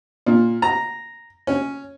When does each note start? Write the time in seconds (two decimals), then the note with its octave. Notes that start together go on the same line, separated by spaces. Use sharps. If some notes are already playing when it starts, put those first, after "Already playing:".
0.26 A#2
0.62 A#5
1.47 C#4